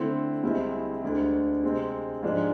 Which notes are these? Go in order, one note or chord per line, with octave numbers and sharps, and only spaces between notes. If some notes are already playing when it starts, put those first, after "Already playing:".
Already playing: D3 A3 C4 E4
C2 C3 G#3 C4 E4
D2 D3 G#3
C3 G#3 C4
G#2 F3 G#3 D4